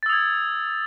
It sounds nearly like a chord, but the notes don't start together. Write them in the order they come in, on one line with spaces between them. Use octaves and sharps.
A6 E6 D#6 G#6